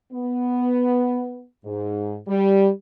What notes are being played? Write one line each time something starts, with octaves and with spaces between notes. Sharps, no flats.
B3
G#2
G3